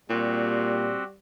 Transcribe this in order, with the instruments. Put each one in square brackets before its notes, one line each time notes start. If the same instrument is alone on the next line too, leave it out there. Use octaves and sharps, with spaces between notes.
[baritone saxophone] A#2 [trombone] G3 [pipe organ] C4 F#4 G4